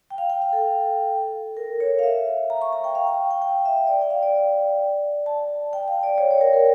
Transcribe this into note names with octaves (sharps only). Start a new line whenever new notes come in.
G5
F5
G5
F5
A4
A#4
C#5
F5
E5
A#5
C#6
A#5
G5
F5
G5
G5
G5
E5
D5
G5
F5
D5
A5
G5
F5
D5
C#5
C#5
A#4
A#4